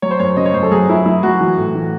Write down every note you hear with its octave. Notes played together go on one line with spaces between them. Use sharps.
F#3 C#5
C5
F#2 C#5
C#3 D#5
C#5
F#2 C5
A4
F#3 G#4
F#2 E4
F#3 E4
F#3 F#4
E3
A2
E3